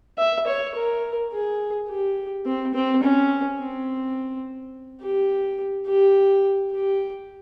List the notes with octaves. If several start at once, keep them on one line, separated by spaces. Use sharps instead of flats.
E5
C#5
A#4
G#4
G4
C4
C4
C#4
C4
G4
G4
G4